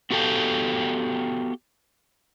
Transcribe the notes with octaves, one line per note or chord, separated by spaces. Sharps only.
B3 F#4 G4 A4 F5 G5